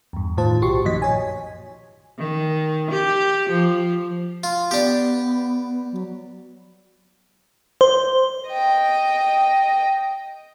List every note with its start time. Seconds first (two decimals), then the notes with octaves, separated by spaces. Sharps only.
0.13 E2 G2
0.38 A2 D#3 F4 C5 A5
0.62 B1 F#4 G4 C6 C#6
0.85 F#2 A#2 D#3 F3 D#5 B6
1.02 C#5 G#5
2.18 D#3
2.91 G4
3.50 F3
4.44 F4
4.71 B3 D4 G4
5.92 F#3
7.81 C5
8.49 D#5 G5